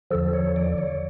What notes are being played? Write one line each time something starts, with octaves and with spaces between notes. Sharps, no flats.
E2 D3 F3 A4
C#5
D5
C#5